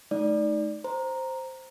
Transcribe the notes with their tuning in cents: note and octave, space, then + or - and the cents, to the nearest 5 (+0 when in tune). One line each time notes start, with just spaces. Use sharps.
A3 -35 D#4 +0 D5 +0
C5 +0 A#5 +0